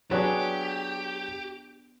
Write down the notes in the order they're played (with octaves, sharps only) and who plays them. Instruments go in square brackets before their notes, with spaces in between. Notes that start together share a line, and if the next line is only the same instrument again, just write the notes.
[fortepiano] F#3 [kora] B3 D4 G#4 [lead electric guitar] G4